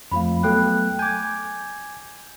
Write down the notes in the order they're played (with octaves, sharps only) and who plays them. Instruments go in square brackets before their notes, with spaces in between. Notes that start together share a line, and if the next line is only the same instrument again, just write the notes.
[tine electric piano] F2 F3 A3 [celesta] F5 B5
[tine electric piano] F#3 A3 B3 [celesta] A4 G5 F#6
[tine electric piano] G#5 D6 [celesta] G6 G#6